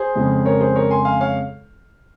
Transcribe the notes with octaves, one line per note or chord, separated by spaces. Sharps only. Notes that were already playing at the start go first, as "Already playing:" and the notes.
Already playing: G#4 C5
F2 C#3 G#3
A#4 C#5
G#4 C5
A#4 C#5
G#5 C6
F5 G#5
C#5 F5